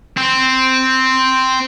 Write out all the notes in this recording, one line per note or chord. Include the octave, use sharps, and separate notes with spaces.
C4